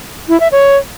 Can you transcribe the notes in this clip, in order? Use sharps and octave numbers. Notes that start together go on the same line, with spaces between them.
E4
E5
C#5